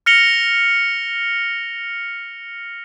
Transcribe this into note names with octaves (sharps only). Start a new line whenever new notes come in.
F6 A#6 C#7 F7 G7